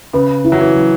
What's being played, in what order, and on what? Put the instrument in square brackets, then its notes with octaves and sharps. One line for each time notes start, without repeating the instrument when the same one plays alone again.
[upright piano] C#3 [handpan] B4
[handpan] E4
[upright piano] F#3
E3
[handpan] F#3